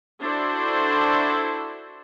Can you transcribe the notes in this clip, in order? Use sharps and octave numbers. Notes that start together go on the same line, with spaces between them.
D4 E4 F#4 A4 C5